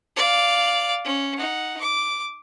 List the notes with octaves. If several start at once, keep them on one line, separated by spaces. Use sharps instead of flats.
D5 F5
C#4
D#4 F#5
D6